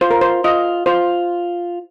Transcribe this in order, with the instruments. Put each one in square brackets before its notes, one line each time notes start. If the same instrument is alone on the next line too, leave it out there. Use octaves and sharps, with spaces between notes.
[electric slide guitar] F4 [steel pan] C5
[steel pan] A#4
C5
[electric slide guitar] F4 [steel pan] D#5
[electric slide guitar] F4 [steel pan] C5